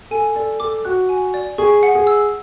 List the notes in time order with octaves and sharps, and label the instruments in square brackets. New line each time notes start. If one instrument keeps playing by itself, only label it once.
[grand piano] A4 [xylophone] G#5
[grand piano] A4 [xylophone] D5
[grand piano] A4 [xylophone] D6
[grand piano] F#4 [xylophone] F#6
[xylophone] G#5
D5
[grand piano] G#4 [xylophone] C#6
[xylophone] F#5
[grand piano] G#4
[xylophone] E6